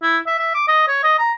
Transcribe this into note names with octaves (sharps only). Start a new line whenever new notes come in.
E4
E5
E5
D6
D#5
C#5
D#5
A#5